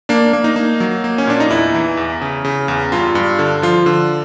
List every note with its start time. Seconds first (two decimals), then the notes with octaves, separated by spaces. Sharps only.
0.09 A#3 D4
0.33 A#3
0.44 D#4
0.56 A#3
0.80 F#3
1.04 A#3
1.18 C#4
1.27 A#2 D4
1.40 D#4
1.50 E2 E4
1.75 E3
1.97 E2
2.21 C#3
2.45 C#3
2.68 E2
2.92 G2 F4
3.15 G2
3.39 D3
3.62 F3 F4
3.86 D3